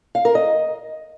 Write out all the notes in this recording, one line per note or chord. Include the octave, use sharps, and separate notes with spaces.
F5
A#4
D#5